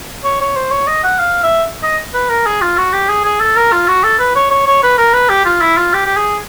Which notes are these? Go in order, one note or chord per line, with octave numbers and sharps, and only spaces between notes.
C#5
C#5
C5
C#5
D#5
F#5
F5
E5
D#5
B4
A#4
G#4
F4
F#4
G4
G#4
G#4
A4
A#4
F4
F#4
A4
B4
C#5
C#5
C#5
B4
A#4
B4
G4
F4
E4
F4
G4
G4
G#4